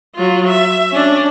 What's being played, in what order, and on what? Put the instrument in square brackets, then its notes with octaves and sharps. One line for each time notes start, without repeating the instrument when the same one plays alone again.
[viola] F#3 F4
E5
C#4 D4